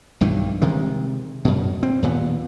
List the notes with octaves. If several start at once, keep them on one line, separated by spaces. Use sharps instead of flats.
B1 G2 D#3 E3
C3 D#3 G#3
F#2 B2
C4
D#2 A#2 B3